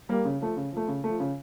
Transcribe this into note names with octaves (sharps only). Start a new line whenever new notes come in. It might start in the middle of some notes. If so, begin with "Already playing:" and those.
G3 A#3
C#3
F3 A3
C#3
F3 A3
C#3
A3
F3
C#3